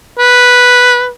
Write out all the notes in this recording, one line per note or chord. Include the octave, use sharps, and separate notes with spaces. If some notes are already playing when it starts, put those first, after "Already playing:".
B4